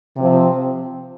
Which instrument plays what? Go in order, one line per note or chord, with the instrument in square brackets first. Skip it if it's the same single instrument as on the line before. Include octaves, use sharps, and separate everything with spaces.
[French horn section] C3 F3 C4